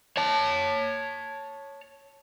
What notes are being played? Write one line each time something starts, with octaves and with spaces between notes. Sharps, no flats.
C#5 A5